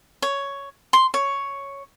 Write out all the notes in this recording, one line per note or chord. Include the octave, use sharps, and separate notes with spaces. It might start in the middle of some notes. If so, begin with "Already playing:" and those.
C#5
C6
C#5